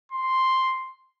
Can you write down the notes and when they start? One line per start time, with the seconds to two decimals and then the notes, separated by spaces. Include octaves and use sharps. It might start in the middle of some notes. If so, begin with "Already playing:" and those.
0.12 C6